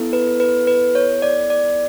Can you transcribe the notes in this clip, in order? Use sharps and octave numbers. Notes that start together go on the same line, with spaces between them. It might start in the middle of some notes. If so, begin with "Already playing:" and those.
Already playing: B3 E4 A4
B4
B4
B4
C#5
D5
D5